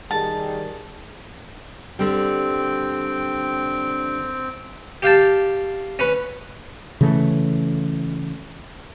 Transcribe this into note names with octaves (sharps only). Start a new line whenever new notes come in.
D#3 G3 G#4 A5
D3 G3 C4 G5
G4 F5 G5 A5
C#4 B4
C#3 E3 A3